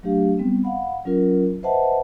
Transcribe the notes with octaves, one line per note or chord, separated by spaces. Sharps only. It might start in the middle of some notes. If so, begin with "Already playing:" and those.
F#3 A3 D4 G4 F5
G3 B3 C4
F5 F#5 B5
F#3 C#4 F4 A#4
B4 C5 D#5 E5 F#5 A5